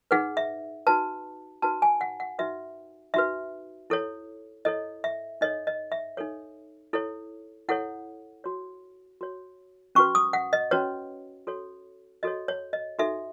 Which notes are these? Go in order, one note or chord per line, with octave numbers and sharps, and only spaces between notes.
D#4 G#4 B4 F#5
E5
D#4 F#4 B4 A5
D#4 F#4 B4 A5
G#5
F#5
F#5
D#4 F#4 B4 E5
D#4 F#4 B4 E5
E4 A4 C#5
E4 A4 C#5 D#5
E5
D#4 A4 C#5 D#5
D#5
E5
D#4 A4 C#5
E4 A4 C#5
E4 A4 C#5 F#5
F#4 C#5
F#4 C#5
C#4 F#4 B4 C#6
D#6
F#5
D#5
C#4 F#4 B4 C#5
F#4 A4 C#5
F#4 A4 C#5 D#5
C#5
D#5
D#4 F#4 A4 E5